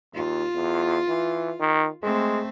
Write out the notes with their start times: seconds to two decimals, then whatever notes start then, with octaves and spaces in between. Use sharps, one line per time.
0.14 D#2 F4
0.55 E2
1.08 E3
1.60 D#3
2.03 G#3 A3 C4